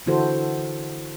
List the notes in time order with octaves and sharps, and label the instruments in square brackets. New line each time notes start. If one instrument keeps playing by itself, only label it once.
[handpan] D3 E3 E4 F#4 A4 C5